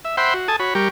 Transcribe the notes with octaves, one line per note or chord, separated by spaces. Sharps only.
E5
C5 E5 F#5 G5 B5 C6
F#4
A4 G#5 A5 D#6
F#4 C#5 B5
G3 G4 A#4 C#6